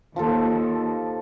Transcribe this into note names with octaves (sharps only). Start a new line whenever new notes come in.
D#2 F3 F4 A4